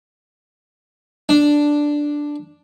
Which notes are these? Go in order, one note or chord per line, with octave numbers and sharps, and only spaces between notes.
D4